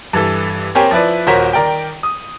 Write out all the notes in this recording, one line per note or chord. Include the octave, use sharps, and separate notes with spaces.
G2 E3 A4
A#3 C4 G4 A#4 C#5 G#5
F3 E4 B4 D5
D#1 F#4 A#4 C5 C#5 B6
D#3 A#4 D5 G5
D#6